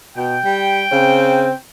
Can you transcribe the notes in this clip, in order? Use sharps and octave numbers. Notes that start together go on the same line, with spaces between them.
B2 G5
G3
C#3 C4